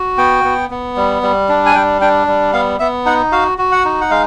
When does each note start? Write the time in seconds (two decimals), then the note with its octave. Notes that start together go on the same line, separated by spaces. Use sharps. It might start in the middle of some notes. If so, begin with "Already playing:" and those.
Already playing: F#4
0.18 B3 G5
0.44 B3
0.71 B3
0.96 G3
1.22 G3
1.49 D4
1.66 G#5
1.75 G3 G5
2.01 D4 G5
2.27 G3
2.53 B3 F5
2.80 B3 E5
3.06 D#4 F#5
3.32 F#4 F5
3.58 F#4
3.72 F#5
3.85 D#4
4.01 F#5
4.10 G#3 F5